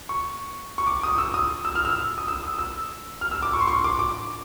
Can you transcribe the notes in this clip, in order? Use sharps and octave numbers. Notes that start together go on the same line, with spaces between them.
C#6
C#6
D6
D#6
E6
D#6
E6
F6
E6
D#6
E6
D#6
E6
F6
E6
D6
C#6
C6
C#6
D6
D6